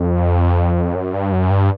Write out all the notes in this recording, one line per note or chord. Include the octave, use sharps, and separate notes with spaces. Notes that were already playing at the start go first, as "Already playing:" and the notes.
Already playing: F2
F#2
G2
F#2
G2